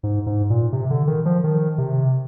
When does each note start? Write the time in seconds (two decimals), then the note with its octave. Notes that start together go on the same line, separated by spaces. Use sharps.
0.03 G#2
0.26 G#2
0.50 A#2
0.73 C3
0.91 D3
1.07 D#3
1.25 F3
1.44 D#3
1.78 C3